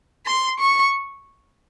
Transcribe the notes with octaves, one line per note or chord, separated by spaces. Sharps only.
C6
C#6